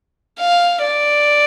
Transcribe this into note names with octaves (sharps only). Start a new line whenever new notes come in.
F5
D5